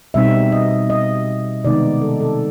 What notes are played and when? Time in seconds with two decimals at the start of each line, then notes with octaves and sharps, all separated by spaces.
0.14 B2 G3 C4 D#4 E5
0.52 D#5
0.90 D#5
1.65 C3 D#3 G#3 B3 D#4 D5
2.02 A4
2.20 A4